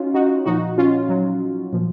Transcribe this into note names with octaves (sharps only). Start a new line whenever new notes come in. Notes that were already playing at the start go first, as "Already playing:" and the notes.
Already playing: C#4 D#4 F4 F#4
D#4 F#4
A#2 F3 D#4 F#4
C#4 F4
F#3
A#2 F3